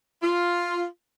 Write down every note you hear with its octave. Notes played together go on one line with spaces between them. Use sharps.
F4